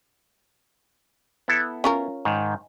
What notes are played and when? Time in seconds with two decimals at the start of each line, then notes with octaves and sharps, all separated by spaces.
1.48 B3 E4 A4
1.84 C#4 F4 A#4
2.25 G#2 D#3